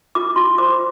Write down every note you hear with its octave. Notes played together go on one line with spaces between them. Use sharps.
F4 D6
F4 C6
C5 D6